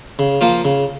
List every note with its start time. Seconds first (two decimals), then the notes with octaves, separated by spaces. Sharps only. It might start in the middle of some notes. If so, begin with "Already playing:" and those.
0.19 C#3
0.41 F3 A#3 F4 C5
0.65 C#3